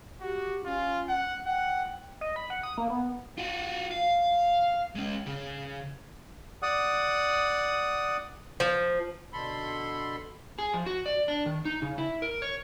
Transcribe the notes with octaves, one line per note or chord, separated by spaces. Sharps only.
F#4 G4
C#4 F4
F#5
F#5 G5
D#5
B5
F#5
D#6
A#3
B3
F4 F#4
F5
G#3 C#4
C#3
D5 F#5 D#6
F3
B2 D3 A4 B5 C6
G#4
F3
F#4
D5
D4
D#3
D#4
C#3
E4
A#4
C#5